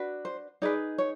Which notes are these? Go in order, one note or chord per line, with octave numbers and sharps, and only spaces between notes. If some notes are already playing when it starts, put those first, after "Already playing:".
Already playing: D4 F#4 B4
C5
D#4 G#4 B4 D5
C#5